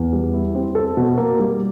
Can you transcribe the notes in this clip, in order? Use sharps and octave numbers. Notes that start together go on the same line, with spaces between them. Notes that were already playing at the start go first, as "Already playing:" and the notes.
Already playing: E2
G3
E4
C4
A4
B2
A#3
G3